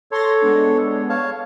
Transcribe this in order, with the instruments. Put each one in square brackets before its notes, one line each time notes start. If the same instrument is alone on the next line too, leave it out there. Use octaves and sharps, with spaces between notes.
[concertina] A4 C#5 [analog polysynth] C6 A6 A#6
[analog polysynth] G#3 B3 D4
[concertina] C#5 F5 A5